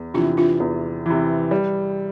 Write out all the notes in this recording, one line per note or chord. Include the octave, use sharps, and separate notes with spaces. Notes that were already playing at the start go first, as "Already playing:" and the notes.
Already playing: E2
C3 E3 D4 F4
D4 F4
E2
C3 E3
G3